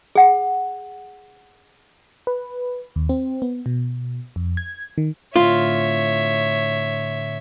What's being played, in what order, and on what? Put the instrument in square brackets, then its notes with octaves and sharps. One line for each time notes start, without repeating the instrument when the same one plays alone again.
[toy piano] G#4 F#5
[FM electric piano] B4
D#2
C4
B3
B2
F2
G#6
D#3
[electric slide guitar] A2 D3 C4 [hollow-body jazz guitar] F4 [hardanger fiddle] C#5 E5